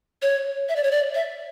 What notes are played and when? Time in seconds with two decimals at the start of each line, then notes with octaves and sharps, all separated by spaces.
0.22 C#5
0.69 E5
0.76 D5
0.84 C#5
0.92 D5
1.15 E5